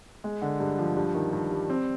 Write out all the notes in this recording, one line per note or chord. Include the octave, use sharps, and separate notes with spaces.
G#3
D3
G2
F3
G2
D#3
G2
G3
C4